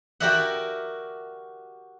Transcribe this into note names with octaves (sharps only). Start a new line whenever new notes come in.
F#4 G4 A#4 D5 E5 F#5